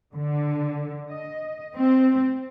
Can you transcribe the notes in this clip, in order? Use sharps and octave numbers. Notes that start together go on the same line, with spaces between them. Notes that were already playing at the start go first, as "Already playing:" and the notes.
D3
D#5
C4